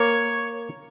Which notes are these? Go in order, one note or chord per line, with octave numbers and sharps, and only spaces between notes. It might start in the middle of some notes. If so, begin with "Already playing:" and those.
Already playing: A#3 C#5